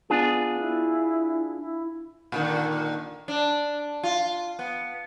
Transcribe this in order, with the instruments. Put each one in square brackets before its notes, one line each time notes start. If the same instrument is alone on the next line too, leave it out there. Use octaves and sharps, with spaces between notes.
[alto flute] B3 [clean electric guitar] D4 F4 G#4
[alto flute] E4
E4
[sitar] A#2 D3 D#3
D4
F4
B3